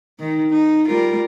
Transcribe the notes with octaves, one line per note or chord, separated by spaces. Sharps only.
D#3 D#4
D#4
G3 F4 A#4